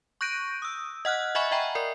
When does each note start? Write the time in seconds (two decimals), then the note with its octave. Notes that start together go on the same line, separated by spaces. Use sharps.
0.21 C#6 F#6 G6 A#6 D7 D#7
0.62 D#6 E6
1.05 D#5 F#5 F6 F#6
1.35 D#5 E5 F#5 G#5 B5 C#6
1.51 D#5 E5 G5 A#5 B5
1.75 A#4 D5 C7